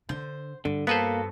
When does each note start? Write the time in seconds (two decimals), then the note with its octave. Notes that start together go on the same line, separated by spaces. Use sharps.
0.09 D3 C5
0.65 G2 D3
0.87 A#3 B3 F#4 A4 B4 C5